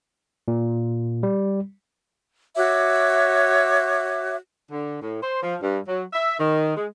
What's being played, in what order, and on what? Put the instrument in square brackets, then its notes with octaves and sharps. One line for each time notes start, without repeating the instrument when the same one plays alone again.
[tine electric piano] A#2
G3
[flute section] F#4 C#5 E5 D6
[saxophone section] D3
A2
C5
F3
G2
F#3
E5
D#3
G#3